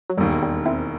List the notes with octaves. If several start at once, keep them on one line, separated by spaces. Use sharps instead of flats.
F#3
E1 D#2 D#3 G3
G3
C4 E4